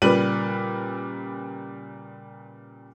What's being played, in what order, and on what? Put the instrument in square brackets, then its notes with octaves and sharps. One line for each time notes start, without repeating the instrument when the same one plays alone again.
[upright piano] A#2 C#3 G3 B4 D#7 F#7